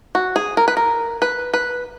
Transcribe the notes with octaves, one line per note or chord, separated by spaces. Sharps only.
F#4
G#4
A#4
B4
A#4
B4
B4